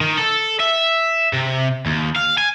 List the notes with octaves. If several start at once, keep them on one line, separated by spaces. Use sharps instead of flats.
D#3
A4
E5
C3
D#2
F5
G#5